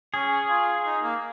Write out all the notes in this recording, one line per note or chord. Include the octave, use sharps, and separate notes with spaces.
C#4 G#4
F4
D#4
A#3